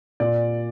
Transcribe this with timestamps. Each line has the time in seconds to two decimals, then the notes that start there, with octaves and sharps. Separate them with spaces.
0.20 A#2 D5